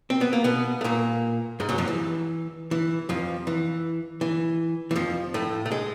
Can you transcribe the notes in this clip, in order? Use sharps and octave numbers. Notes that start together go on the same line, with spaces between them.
C4
B3
A#3
B2 B3
A3
A#2 A#3
G#2 G#3
F#2 F#3
F2 F3
E3
E3
F2 F3
E3
E3
E3
F2 F3
A2 A3
A3
G#3